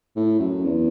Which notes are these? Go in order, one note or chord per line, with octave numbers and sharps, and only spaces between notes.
A2
F#2
E2